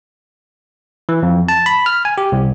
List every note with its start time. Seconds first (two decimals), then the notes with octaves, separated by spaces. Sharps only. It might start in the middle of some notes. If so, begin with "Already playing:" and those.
1.09 E3
1.23 F2
1.49 A5
1.66 B5
1.86 F6
2.05 G#5
2.18 G4
2.32 C2